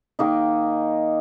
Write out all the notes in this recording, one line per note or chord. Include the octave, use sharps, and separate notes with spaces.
D#3 A#3 D#4